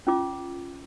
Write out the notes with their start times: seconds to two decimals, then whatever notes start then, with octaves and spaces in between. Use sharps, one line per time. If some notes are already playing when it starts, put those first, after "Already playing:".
0.07 C#4 F4 D6